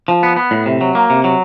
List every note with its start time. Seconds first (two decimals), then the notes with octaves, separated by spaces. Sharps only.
0.08 F3
0.23 B3
0.36 B3
0.51 A2
0.66 C3
0.81 F#3
0.95 A#3
1.10 C3
1.24 F#3